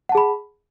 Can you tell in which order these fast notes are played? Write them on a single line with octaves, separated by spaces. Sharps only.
F#5 A5 G#4 B5